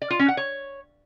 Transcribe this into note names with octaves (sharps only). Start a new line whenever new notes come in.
D5
F4
C#4
F#5
C#5